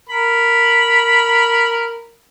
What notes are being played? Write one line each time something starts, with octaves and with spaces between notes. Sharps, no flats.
A#4 B5